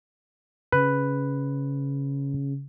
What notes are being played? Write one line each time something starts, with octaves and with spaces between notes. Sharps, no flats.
C#3 B4